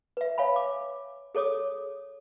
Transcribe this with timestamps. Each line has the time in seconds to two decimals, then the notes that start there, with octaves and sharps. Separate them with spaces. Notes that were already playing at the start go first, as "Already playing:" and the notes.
0.17 B4 E5
0.38 C#5 F5 G#5 B5
0.56 D6
1.35 G#4 A4 C#5 D6 D#6